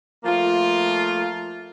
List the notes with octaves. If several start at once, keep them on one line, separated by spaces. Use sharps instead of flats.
F3 A3 A#3 F4